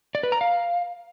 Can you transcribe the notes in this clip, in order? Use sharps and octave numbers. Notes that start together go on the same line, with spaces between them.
D5
B4
A#5
F5